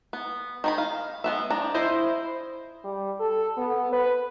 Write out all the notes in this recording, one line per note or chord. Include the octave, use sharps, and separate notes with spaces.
B3
D#3 D#4 B5
F5
G#3 B3 E5
F3 D4 A#5
E4 C5 D#5
G3
A4
B3
B4